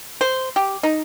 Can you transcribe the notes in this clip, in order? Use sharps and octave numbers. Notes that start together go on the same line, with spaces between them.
C5
G4
D#4